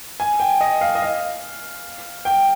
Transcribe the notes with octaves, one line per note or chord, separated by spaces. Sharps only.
G#5
G5
D#5
F5
D#5
F5
G5